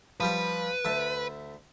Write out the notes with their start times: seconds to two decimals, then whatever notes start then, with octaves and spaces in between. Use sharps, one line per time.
0.20 F3 G3 G4 B4
0.85 D2 E5 A5